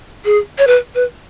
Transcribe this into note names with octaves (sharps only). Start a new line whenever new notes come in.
G#4
C#5
B4
B4